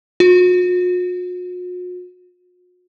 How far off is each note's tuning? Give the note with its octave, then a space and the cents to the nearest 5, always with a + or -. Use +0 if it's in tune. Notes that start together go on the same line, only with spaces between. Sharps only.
F#4 -45